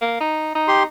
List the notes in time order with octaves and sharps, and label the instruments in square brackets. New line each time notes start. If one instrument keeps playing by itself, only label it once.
[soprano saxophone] A#3
D#4
D#4
[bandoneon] G4 C6